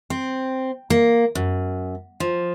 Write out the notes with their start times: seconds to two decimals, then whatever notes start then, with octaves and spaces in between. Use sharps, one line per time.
0.10 C4
0.90 A#3
1.35 F#2
2.20 F3